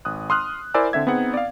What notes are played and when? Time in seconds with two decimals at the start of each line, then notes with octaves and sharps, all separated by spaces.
0.05 G#1 D#6 F#6
0.30 C6 D#6 F6 F#6
0.74 E4 A#4 C5 D5 G#5 E6
0.93 D3 C4 E5 G#6
1.07 B3 C4 D#4 G#4 F#5
1.33 D5 F5